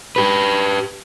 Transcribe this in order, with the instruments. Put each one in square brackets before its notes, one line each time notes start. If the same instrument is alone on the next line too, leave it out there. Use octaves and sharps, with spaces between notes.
[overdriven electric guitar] G4 B4